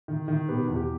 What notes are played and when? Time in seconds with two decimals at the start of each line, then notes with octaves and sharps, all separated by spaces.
0.08 D#3
0.28 D#3
0.48 B2 G4 B4
0.68 E2
0.76 G4